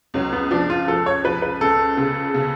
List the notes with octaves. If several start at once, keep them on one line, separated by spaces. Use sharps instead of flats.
C#2 F#3
B3
F3 D4
F4
F3 A4
C#5
F3 B4
B4
C#2 A4
C#3
C#3